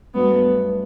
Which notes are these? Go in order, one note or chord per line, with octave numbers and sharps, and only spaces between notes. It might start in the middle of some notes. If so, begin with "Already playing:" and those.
G2 F#3 A3 B3